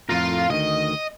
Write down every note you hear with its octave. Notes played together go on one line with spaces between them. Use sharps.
F2 A2 F4 A#4
D2 D#3 D#5